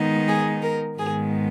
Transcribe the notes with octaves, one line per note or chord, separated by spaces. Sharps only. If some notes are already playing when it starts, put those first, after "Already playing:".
Already playing: D#3 G#3 B3 D#4
G#4
A#4
G#2 D#3 G#3 B3 G#4